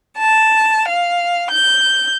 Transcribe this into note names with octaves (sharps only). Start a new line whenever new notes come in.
A5
F5
G6